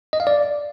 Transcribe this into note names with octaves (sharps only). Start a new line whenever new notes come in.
D#5
F5
D5